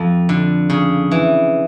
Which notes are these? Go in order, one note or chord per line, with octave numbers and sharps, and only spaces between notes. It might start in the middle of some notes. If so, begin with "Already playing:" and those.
Already playing: F2
D3
C#3
E3